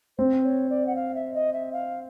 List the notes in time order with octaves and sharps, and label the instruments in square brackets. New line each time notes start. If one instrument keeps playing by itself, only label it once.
[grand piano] C4 [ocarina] C5
[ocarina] C#5
D5
F#5
F5
E5
D#5
E5
F5